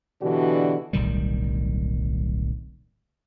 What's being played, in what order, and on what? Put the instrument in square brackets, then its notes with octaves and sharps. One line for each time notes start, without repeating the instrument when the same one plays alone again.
[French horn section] B2 D3 E3 D4 F#4 G4
[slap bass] D1 B1 D#3 G3